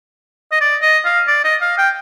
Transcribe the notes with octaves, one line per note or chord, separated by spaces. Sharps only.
D#5
D5
D#5
F5
D5
D#5
F5
G5